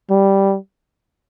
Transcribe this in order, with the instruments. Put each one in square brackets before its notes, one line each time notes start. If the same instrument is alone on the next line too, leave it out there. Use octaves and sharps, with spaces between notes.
[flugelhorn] G3